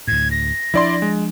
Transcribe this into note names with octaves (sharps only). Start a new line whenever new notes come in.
D2 A2 G#6
A#6
F3 D4 E4 D5 C6
G#3